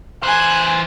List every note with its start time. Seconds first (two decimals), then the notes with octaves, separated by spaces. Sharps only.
0.23 E3 C5 G#5 F#6